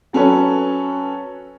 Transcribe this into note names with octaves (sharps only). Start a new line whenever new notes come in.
F#3 C#4 A4 B4 C#5